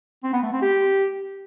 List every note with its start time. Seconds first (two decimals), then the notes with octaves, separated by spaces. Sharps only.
0.24 C4
0.33 B3
0.43 A3
0.52 C4
0.62 G4